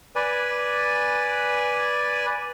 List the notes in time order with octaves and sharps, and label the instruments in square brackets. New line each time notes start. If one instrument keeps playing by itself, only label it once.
[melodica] B4 D5 G#5